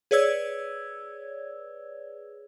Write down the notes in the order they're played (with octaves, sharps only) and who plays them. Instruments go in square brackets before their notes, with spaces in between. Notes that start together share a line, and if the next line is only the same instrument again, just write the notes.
[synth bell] G#4 B4 C#5 D5 E6 G#6